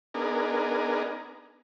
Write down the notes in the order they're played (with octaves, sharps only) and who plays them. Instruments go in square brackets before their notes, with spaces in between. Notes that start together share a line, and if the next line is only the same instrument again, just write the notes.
[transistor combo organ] B3 D4 D#4 G#4 A#4